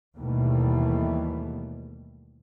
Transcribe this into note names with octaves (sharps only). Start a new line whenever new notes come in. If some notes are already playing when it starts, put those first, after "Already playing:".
D#2 B2 E3 G3 A3 B3